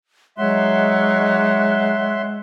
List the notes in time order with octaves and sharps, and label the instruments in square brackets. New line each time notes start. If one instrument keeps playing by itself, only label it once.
[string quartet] F#3 D#4 [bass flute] G#3 [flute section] C#5 F#5 F#6 [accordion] E5 C6